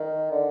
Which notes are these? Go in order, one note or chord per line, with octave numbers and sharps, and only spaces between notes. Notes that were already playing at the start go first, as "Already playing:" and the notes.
Already playing: D#3
D3